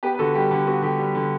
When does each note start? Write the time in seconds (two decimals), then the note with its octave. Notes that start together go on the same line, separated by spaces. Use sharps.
0.03 B3 G4 B4
0.14 B4
0.19 D3 F#4 A4
0.35 G3 G4
0.51 D3
0.66 B3 F#4
0.82 D3 G4
0.99 G3
1.15 D3